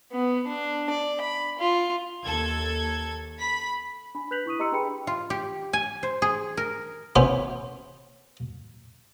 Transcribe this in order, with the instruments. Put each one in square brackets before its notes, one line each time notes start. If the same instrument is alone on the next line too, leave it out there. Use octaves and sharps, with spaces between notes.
[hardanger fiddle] B3
D4
D5
B5
F4
[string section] D#2 A4 G#6
B5 B6
[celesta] D4 B5
B4 F#6 G6 B6 F7 F#7
E4 C#6 D#6 D#7
G4 D#5 A#5 C6 E6 C#7
D4 G#4 B4 G5 B5 C#7
[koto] F4
G4
G#5
C5
G#4
A#4
[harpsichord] B3 C#4 E4 B4 C5